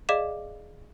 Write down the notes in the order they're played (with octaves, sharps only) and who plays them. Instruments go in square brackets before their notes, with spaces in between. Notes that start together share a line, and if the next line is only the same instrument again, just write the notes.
[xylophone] G#4 D5 D#5 F5 D6 E7